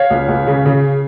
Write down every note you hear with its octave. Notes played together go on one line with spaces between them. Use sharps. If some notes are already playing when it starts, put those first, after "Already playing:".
Already playing: C#5 F5
C#2
C#2
C#3
C#3